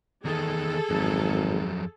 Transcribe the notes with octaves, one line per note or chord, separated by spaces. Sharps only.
E2 D#3 G#4 A4
G#1 F2 F#3